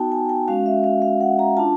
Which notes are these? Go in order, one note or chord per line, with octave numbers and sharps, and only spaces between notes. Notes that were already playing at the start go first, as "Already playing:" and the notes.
Already playing: B3 D#4 F#4 G5 A5
G#5
G5
G#3 C#4 F#4 F5
E5
F5
F5
F#5
A#5
D4 F4 A5